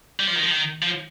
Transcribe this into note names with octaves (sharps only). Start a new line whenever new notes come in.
G3
F3
D#3
F3
D#3
F3